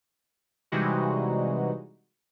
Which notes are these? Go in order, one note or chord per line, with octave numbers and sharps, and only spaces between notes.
C3 E3 G3 G#3 D#4 F#4